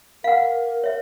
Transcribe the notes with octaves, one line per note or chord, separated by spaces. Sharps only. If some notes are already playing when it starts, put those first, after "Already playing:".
A#4 F5 F#5
C#5 E5